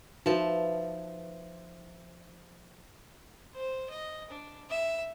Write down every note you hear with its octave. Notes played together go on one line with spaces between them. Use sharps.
F3 D#4 F#4 A#4 B4 E5 A5
C5
D#5
D4
E5